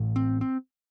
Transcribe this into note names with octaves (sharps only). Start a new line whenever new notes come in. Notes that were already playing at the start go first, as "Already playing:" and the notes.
Already playing: A1 A2
C4
C4